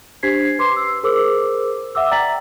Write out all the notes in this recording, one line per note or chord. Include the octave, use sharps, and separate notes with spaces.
D4 G4 C5 G#6 B6 C7
B4 C6 D6 C7
E6
G#4 A#4 C5 D6 E6
E5 F#5 D6 E6
D5 G5 A#5 A6 B6 F#7